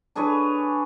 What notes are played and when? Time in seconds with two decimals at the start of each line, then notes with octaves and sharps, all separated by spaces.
0.15 D4 G#4 B4 C#5